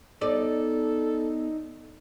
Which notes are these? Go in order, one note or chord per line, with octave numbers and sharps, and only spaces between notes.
B3 D#4 A4 D5